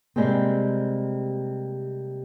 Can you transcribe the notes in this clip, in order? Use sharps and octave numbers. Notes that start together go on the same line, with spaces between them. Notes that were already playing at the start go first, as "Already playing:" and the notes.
C3 D#3 G3 G#3 A#3 C4